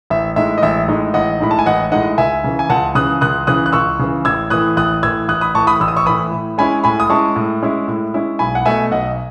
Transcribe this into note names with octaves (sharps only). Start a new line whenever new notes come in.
A1 E5
A2 G#3 D#4 E5
D#5
A1 E5
A2 G#3 D#4
A1 D#5 F#5
A2 G#3 D#4 B5
A5
G#5
A1 D#5 F#5
A2 G#3 D#4 D#5 F#5
C#2 E5 G#5
C#3 E3
G#5
C#2 F#5 A5
C#3 E3 D#6 F#6
C#2 D#6 F#6
C#3 E3 D#6 F#6
F#6
C#2 C#6 E6
C#3 E3
A1 E6 G#6
A2 E3 D#6 F#6
A1 D#6 F#6
A2 E3 E6 G#6
A1 D#6 F#6
B5 D#6
A2 E3 A5 C#6
B5 D#6
A1 E6
D#6
C#6 E6
A2 E3 B5 D#6
A2
G#3 C#4 E4 G#5 B5
A2 G#5 B5
D#6
G#3 C#4 E4 A5 C#6
A2
G#3 C#4 E4
A2
G#3 C#4 E4
B1 G#5 B5
F#5
B2 A3 E5 G#5
B1 D#5 F#5